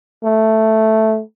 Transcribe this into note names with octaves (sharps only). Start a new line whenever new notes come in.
A3